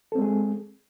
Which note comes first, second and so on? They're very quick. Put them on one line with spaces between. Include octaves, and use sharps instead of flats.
A4 C4 G#3 G#4